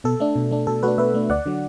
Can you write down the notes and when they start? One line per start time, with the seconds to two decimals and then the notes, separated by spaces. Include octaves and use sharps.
0.04 B2 A4
0.20 A3 D4
0.36 B2
0.51 A3 D4
0.67 B2 A4
0.83 A3 D4 F#4 B4
0.98 B2 B4 E5
1.14 A3 D4
1.29 D2 D5 F#5
1.46 D3 F#3